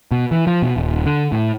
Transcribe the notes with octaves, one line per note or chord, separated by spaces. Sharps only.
B2
E3
F3
B2
D#1
D3
A2